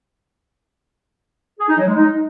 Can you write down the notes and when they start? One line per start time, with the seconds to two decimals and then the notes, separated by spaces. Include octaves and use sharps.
1.60 G#4
1.69 D#4
1.78 F#3
1.87 G#3
1.96 D#4